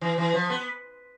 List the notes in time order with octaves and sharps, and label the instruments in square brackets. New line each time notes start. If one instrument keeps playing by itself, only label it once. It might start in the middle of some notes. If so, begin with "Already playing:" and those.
[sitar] E3
E3
F3
B3